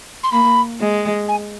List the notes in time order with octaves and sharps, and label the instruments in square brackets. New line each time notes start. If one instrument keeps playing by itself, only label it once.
[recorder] C6
[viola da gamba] A#3 [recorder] B5
[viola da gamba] G#3
[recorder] G#5